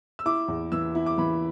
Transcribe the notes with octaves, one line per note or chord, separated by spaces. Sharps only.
E6
E4 D6
E2
E3 E6
E4
D6
E3 B5